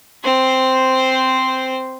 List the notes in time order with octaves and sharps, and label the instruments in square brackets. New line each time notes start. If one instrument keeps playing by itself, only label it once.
[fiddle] C4 C5